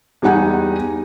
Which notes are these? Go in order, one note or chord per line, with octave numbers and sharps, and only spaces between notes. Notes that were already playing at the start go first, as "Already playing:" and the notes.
E2 G3 D#4 F#5 G#5